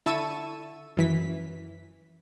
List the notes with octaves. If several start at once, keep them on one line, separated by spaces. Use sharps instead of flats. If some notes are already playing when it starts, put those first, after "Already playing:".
D3 E4 A5 C#6 E6 D#7
F#2 E3 B6